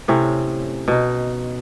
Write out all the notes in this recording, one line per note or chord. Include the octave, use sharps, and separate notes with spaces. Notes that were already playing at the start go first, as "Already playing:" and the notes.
A2 C3 C#4
B2 D#4